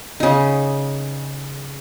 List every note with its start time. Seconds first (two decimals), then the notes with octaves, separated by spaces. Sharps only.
0.20 C#3 D#4